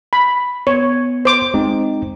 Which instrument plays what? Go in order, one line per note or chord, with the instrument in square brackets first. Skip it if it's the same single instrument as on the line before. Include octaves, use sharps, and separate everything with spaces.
[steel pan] B5
[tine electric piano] B3 [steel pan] C#5
[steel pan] C5 D6
[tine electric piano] G#3 C4 D#4